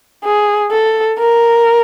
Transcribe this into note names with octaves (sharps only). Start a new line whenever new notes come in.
G#4
A4
A#4